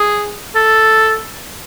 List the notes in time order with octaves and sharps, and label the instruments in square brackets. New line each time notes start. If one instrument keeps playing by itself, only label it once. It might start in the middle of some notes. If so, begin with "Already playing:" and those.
Already playing: [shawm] G#4
A4